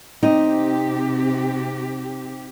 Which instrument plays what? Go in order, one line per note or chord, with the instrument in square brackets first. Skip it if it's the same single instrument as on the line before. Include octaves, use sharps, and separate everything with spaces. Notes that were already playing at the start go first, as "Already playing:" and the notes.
[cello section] C3 G4 [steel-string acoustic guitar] C4 D#5 [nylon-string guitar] D#4